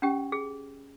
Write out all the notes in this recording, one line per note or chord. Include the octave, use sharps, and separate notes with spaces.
C#4 G4 G5
G#4